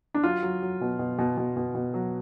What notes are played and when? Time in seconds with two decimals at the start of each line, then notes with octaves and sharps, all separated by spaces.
0.14 D4
0.23 F#3 F4
0.43 F#3
0.62 F#3
0.81 B2
0.99 B2
1.18 B2
1.37 B2
1.57 B2
1.75 B2
1.94 F#3